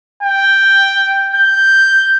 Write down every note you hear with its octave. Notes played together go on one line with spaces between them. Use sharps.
G5
G6